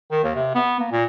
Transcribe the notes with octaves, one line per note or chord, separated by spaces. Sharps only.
D#3
D#2
C3
B3
A#3
A#2